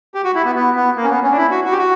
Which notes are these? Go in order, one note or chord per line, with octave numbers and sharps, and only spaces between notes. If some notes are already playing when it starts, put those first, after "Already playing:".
G4
F#4
E4
B3
B3
B3
A#3
C#4
B3
C#4
D4
E4
F#4
F#4
G4
F#4